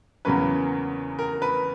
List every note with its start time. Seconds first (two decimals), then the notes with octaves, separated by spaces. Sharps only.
0.25 E2 C#3 F#3 A#3 C#4 B4
1.19 A#4
1.42 B4